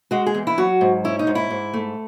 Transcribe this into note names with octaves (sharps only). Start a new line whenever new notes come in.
G#3 F#4
G#4
E2
E4
F#3 F#4
G#2
C#4 E4
D#4
G#2
E4
G#2
A3